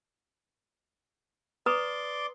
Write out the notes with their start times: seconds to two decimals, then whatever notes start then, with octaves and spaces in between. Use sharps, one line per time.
1.66 B4 D5 A#5 C6 D6 D#6